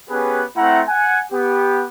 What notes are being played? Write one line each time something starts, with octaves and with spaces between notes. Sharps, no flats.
B3 C#4 G4 G#4 B4
A3 C4 E4 F#5 A#5
F#5 G#5
B3 G4